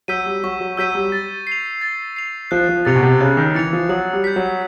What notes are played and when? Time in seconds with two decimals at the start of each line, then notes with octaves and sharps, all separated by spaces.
0.08 F#3 E6 G6 B6 D#7
0.26 G3
0.44 F#3 C#6
0.61 F#3
0.77 F#3 E6 G6 B6 D#7
0.95 G3
1.12 A6
1.47 C7 F7
1.81 A6
2.16 C7 F7
2.51 F3 F#6
2.69 F3
2.85 C3 A6 C#7 F7
2.96 B2
3.03 C3
3.21 C#3 F#6
3.37 D#3
3.54 E3 A6 C#7 F7
3.73 F3
3.89 F#3 D#6
4.13 G3
4.24 G6 B6
4.36 F#3